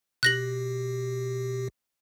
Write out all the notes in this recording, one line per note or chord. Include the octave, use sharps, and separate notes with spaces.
B2 G4 F#6 A#6 F#7